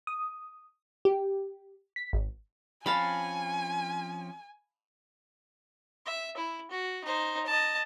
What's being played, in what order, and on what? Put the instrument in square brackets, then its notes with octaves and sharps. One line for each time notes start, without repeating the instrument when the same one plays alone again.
[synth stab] D#6
G4
B6
G#1
[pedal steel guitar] F3 C4 C#4 [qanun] F5 A5 B5 [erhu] G#5
[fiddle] E5
E4
F#4
D#4 C5
D#5 A5